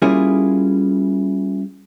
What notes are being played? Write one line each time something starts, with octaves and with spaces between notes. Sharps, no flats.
G3 A#3 C#4 E4 F4 G#4